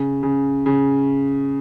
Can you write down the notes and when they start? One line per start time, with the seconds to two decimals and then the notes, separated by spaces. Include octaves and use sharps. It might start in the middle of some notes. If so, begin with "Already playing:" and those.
Already playing: C#3
0.23 C#3
0.66 C#3